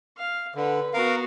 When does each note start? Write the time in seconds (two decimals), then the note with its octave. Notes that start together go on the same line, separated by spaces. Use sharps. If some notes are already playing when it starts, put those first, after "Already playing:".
0.17 F5
0.55 D3 B4
0.94 B3 F#4 A#4 F5